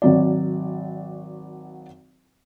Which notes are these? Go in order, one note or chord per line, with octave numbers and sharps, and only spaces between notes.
G#1 F#3 D5